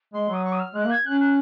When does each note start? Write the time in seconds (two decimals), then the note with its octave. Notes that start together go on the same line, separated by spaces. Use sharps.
0.13 G#3 C6
0.29 F#3 D#6
0.44 C#6
0.52 D#6
0.59 F6
0.75 G#3 F#6
0.85 A#3
0.90 G#6
1.05 C#4 F#6
1.20 F#6